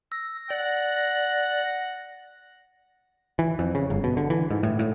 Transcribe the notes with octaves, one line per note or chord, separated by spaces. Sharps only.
E6 A#6
D5 F#5
E3
F2
C#3
G1
B2
D3
E3
G#2
A2
A2